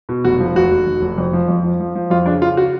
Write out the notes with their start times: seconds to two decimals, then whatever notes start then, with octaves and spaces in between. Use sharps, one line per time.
0.09 B2
0.24 F1 F#4
0.40 F3
0.55 F1 F#4
0.72 F1
0.86 F1
1.02 F1
1.18 F2
1.33 F3
1.48 F2
1.64 F3
1.80 F3
1.95 F3
2.10 F2 F4
2.26 C#3 D4
2.42 C#3 F4
2.57 F#4